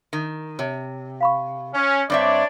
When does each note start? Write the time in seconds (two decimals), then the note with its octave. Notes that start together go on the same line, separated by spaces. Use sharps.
0.13 D#3
0.59 C3 C#5
1.21 F5 B5 C#6
1.74 C#4
2.10 G2 C4 D4 C#5 D5 E5